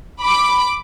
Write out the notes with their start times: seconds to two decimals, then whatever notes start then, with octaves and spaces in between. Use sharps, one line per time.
0.21 B5 D6